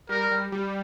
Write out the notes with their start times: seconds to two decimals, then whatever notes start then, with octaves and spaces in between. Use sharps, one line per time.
0.09 G3 A#4
0.31 G3
0.52 G3